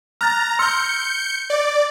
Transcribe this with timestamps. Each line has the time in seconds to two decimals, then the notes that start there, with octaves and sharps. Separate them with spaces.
0.21 A#5 F6 F#6 A6
0.59 C6 E6 F6 G6 C#7
1.50 D5